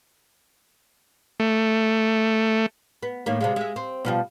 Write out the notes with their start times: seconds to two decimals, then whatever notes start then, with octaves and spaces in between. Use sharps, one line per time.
1.40 A3
3.03 B3
3.26 A2 D#3 A#3
3.41 C3 G3 G#3
3.56 G#3 E5
3.76 C4
4.05 B2 F3 G3